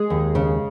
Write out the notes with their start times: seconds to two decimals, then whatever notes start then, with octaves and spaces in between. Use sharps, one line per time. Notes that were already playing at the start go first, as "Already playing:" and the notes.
Already playing: G#3 G#4
0.10 D#2
0.35 C#3